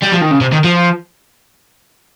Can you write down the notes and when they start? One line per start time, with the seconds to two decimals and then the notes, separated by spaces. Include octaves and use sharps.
0.03 G3
0.12 F3
0.22 D#3
0.31 C#3
0.41 C3
0.52 D#3
0.64 F3